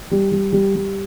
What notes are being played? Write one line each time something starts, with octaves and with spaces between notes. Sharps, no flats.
G3
G3
G3
G3